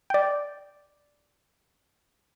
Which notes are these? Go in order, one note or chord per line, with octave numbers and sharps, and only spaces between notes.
D5 G5